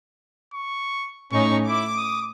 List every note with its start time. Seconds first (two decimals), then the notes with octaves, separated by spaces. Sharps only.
0.54 C#6
1.32 A2 C#4 D#4 C#6
1.67 E4 D6
1.97 D#6